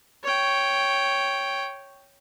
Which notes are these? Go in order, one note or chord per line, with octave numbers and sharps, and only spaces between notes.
C#5 G5